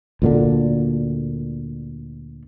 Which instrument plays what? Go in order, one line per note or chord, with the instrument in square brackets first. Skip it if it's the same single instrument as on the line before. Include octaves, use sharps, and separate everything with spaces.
[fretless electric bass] D2 A#2 D3